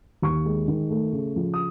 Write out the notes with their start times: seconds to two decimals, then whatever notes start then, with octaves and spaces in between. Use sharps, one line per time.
0.22 D#2 C#6
0.45 G#3
0.68 D#3
0.90 A3
1.13 C#3
1.36 F3
1.54 D#6